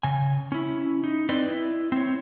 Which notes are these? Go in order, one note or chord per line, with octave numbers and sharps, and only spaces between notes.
C#3 G#5
C#4 E4
D#4
C4 B4 D5 D#5
E4
C4 C#5